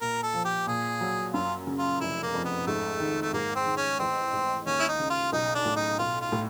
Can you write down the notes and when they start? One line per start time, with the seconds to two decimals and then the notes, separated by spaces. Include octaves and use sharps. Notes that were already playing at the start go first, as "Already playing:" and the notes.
0.01 A#2 A#4
0.23 A4
0.34 F3
0.45 G4
0.67 A#2 G#4
1.01 F#3
1.34 F#2 F4
1.67 C#3
1.78 F4
2.00 F1 E4
2.23 A#3
2.34 F2
2.45 B3
2.67 G#2 A3
3.00 D#3
3.22 A3
3.33 G#2 A#3
3.55 C4
3.66 D#3
3.77 C#4
3.99 A1 C4
4.33 G#2
4.66 D#2 C#4
4.80 E4
4.88 D#4
4.99 C#3
5.10 F4
5.32 B1 D#4
5.55 D4
5.65 A2
5.76 D#4
5.99 B1 F4
6.21 F4
6.32 A2